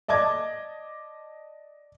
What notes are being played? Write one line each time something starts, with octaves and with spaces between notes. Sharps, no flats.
D5 D#5 A5 D6 G#6